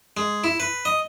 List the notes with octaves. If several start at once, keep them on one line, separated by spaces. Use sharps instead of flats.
G#3
E4
B4
D#5